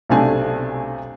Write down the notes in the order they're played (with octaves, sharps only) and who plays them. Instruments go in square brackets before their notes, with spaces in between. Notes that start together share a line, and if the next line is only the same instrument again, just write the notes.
[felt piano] B1 C3 A3 C4 D4 G#5